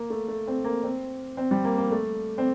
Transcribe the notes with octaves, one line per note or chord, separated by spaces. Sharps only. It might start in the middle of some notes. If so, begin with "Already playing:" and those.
Already playing: A#3
A3
A3
C4
A#3
C4
C4
G3
A#3
A#3
A3
C4